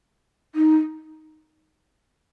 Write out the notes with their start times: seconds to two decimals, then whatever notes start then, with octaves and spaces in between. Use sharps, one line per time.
0.55 D#4